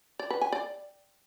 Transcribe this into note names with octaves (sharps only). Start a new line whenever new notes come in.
D5
B4
G#5
D5